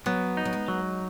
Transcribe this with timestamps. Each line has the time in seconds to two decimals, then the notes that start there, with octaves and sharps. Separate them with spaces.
0.06 F#3 B3
0.37 D#4
0.45 F#3
0.53 G#3
0.68 F#3